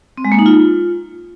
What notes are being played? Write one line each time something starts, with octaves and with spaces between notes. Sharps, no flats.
C4
G#3
A#3
D#4
F4